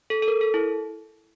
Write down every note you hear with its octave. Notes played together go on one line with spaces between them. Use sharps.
A4
A4
A#4
A4
E4